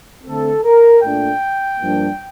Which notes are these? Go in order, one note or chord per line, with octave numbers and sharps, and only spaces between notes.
D3 A3 C4 A4
A#4
A#2 A3 D4 G5
G2 F3 A#3 D4